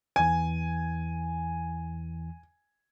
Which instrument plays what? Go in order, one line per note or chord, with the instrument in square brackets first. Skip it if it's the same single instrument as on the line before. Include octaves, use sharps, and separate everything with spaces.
[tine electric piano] E2 E3 [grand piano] G#5